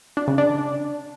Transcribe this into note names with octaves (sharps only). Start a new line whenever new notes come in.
D4
C#3
D4